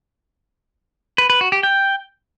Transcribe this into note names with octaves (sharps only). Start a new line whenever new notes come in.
B4
B4
F#4
G4
G5